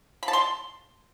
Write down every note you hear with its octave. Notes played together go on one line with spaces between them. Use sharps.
B5
A5
C6